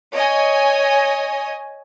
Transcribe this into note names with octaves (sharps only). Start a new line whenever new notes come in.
C#5 D#5 G#5